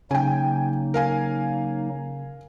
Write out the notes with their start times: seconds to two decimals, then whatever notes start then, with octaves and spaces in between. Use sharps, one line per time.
0.11 C#3 F#3 A#3 D#4 G5 G#5
0.94 A#4 F5 G#5